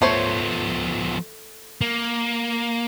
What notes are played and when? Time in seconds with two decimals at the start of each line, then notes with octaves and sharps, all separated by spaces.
0.02 F3 A3 B3 C5 C#5
1.81 A#3